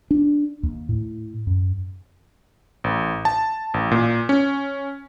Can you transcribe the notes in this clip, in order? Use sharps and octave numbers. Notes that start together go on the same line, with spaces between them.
D4
D#2
A2
F#2
A1
A5
A1
A#2
C#4